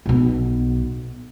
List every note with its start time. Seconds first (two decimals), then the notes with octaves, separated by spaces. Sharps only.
0.06 B1 B2